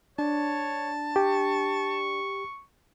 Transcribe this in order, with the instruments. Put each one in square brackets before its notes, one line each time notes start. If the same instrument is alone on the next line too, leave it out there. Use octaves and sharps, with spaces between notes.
[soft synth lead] D4 [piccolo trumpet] C#5 [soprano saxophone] A5
[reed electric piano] G4 [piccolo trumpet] C#6